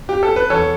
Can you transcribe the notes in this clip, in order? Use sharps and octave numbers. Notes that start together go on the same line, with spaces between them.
G4
A4
B4
E2 A4 C#5